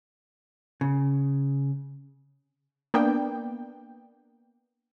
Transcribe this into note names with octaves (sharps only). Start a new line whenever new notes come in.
C#3
A#3 B3 D4 G5